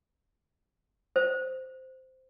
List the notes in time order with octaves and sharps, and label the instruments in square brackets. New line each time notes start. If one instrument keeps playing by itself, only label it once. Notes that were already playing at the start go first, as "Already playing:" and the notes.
[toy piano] C5